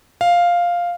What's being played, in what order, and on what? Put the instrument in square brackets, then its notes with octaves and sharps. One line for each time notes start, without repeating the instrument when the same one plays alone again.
[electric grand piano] F5